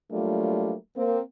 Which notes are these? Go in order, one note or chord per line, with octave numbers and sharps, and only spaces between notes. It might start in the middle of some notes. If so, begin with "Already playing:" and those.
F#3 G3 A3 A#3 D4 F4
A#3 C4